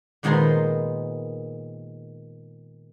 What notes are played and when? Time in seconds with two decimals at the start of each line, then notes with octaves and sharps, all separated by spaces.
0.23 A#2 D#3 G#3 B3 C5 A#5